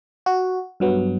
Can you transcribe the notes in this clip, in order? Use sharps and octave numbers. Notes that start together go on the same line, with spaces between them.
F#4
G2 F#3 B3